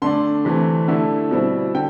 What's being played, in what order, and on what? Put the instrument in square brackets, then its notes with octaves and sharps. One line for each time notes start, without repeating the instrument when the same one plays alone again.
[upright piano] D3 A3 D4 C6
C3 E3 A3
D3 A3 E4
B2 G3 C4 E4
D3 G5